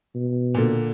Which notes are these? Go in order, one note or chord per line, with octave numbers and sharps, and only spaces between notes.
B2
A#2 D3